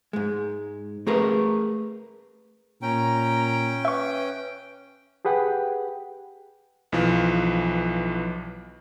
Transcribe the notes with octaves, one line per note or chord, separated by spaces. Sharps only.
G#2 G#3
A3 G#4 A#4 B4
A#2 C#4 G5 A#5
B4 E5 C#6
G4 G#4 B4 F#5 G5
B1 E3 F3